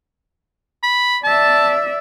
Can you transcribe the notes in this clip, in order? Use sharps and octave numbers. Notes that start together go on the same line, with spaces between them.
B5
D5 E5 A5